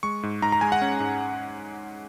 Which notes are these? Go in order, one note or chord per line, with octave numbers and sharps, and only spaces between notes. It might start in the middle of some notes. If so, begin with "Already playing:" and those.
G#3 C#6
G#2
G#2 A#5
A#5
G#3 G#5
F#5
C#4
G#2